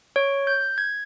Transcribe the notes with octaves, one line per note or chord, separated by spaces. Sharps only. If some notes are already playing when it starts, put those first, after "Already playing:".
C#5
G6
G#6